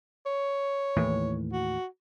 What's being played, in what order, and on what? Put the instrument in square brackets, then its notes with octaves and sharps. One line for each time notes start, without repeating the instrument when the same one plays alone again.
[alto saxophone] C#5
[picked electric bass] D#2 A2 E3
[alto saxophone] F#4